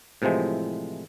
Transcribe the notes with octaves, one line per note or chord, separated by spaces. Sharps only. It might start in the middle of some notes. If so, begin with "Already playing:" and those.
A2 C3 E3 F3 G#3